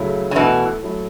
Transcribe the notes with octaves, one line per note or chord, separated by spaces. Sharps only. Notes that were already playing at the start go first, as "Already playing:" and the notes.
Already playing: C#3 F#3 A3 E4
C#3
B2 E3 A3 E4 A4
F#3 A3 E4